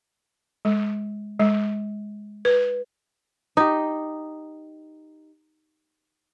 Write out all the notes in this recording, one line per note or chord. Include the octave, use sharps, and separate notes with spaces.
G#3
G#3
B4
D#4 G4